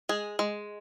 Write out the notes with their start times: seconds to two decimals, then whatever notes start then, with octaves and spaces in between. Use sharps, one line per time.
0.09 G#3 G#4
0.39 G#3